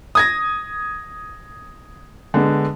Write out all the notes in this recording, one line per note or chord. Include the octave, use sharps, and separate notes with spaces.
D#6 G#6 A#6
D3 G#3 B3